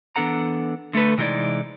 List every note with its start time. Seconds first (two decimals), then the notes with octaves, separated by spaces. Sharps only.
0.16 E3 B3 D4 A4 F#5 A#5
0.93 D3 A3 A4 B4
1.18 C3 E3 G#3 D#4 E4 D5